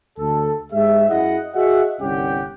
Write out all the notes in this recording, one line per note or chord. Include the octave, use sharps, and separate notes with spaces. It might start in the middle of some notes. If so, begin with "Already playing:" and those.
D2 A4
G#2 G#3 G4 E5
F#2 E4 G#4 D#5 F#5
F#4 G#4 D#5 E5 F#5
G1 C2 C#4 G4 F#5 G5